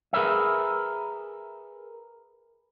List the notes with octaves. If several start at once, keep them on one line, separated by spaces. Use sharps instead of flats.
G#4 A#4 B4 C#5 E5